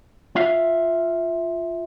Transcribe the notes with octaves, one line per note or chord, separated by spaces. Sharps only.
F4 E5 F5